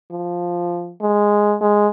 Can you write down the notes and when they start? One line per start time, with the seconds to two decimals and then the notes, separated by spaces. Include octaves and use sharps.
0.12 F3
1.02 G#3
1.61 G#3